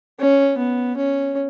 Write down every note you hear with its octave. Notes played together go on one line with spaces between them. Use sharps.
C#4
B3
C#4